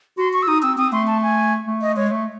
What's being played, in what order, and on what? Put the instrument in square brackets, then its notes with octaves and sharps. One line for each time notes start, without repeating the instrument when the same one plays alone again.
[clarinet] F#4 [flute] C6
[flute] C#6
E6
[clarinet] D#4 [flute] D#6
[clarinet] C4 [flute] E6
[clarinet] C4 [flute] D#6
[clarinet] A3 [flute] C6
[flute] A5
G#5
[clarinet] A3
[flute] D#5
[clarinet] G#3 [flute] C#5
[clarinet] A3